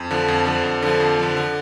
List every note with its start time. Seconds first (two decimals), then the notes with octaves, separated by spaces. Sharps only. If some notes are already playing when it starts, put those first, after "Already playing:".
Already playing: F2
0.11 D3 F3
0.28 F2
0.46 D3 F3
0.64 F2
0.82 D3 F3
1.00 F2
1.19 D3 F3
1.37 D3